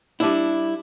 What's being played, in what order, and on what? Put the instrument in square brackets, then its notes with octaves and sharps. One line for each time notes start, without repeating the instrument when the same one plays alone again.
[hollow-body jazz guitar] G3 D4 E4